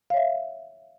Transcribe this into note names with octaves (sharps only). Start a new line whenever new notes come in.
C#5 E5 F5